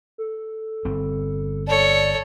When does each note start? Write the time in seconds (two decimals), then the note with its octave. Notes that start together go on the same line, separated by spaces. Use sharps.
0.18 A4
0.85 G1 G3 C4
1.67 A4 C#5 D5